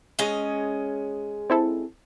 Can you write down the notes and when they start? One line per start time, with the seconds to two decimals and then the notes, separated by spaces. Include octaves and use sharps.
0.19 G#3 C#4 D#5
1.50 C4 E4 A4